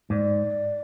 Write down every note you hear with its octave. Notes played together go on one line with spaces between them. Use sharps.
G#2 D5